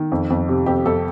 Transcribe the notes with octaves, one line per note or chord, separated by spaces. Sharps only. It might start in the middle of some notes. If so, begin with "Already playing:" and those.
Already playing: D#3
F2
F2
C3
F2 G4
F2 A4